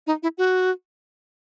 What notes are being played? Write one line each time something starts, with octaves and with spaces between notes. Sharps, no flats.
D#4
E4
F#4